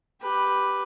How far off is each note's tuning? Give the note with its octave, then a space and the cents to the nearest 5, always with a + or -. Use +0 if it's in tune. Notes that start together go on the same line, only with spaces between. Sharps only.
G4 +0 B4 +0